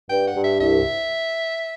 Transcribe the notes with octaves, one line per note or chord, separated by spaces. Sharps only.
G2 G5
F#5
G2
E5
C2 E5